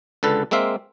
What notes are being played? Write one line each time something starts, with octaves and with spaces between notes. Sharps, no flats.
C#2 D3 A4 B4
G#3 A#3 C4 E5 F5